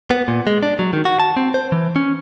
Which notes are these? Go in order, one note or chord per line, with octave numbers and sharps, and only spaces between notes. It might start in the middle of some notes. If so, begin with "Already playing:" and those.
B3
A#2
G#3
D4
F#3
D#3
F#4
A5
C4
C5
E3
C#4